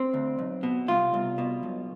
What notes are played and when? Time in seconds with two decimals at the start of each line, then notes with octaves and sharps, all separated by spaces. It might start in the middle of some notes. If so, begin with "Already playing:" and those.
Already playing: C4
0.14 D2
0.39 B1
0.63 B2
0.88 C2 F4
1.14 C2
1.38 B2
1.63 B1